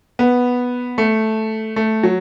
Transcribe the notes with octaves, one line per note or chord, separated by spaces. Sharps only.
B3
A3
A3
F#3